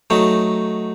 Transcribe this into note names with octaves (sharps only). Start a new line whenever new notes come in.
F#3 A3 D#4